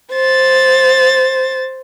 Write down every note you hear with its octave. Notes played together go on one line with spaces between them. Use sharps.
C5 A6